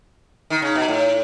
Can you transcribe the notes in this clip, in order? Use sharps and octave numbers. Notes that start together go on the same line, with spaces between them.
D#3
C#3
B2
A2